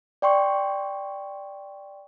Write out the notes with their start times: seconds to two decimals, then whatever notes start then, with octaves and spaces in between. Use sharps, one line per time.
0.22 D5 G5 C6 C#6